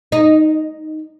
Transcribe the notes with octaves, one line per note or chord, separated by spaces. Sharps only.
D#4